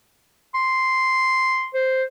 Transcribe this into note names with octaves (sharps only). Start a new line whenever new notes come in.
C6
C5